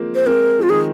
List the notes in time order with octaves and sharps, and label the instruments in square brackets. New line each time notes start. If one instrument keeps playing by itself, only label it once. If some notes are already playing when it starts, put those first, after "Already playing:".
Already playing: [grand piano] F3 G#3 A#3 C4
[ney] C5
[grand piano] G#3 C4 [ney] A#4
[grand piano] F3 [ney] F4
[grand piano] D#3 G#3 [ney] G#4